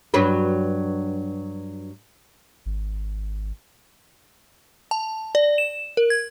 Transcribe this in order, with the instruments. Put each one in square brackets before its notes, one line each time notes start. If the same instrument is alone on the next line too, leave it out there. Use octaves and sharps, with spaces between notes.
[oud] G2 F#3 B4
[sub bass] G#1
[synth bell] A5
D5
E7
A#4
G#6